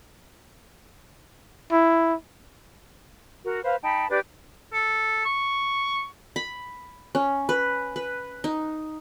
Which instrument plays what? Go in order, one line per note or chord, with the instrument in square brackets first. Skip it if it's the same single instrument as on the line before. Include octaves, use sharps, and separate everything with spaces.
[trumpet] E4
[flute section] F#4 A#4
B4 C5 F5
D#4 G5 A5 B5
D4 G4 B4 D5
[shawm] A4
C#6
[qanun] B5
C#4
B4
B4
D#4